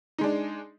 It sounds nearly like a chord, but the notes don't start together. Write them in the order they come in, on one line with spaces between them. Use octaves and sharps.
D#4 G#3 D4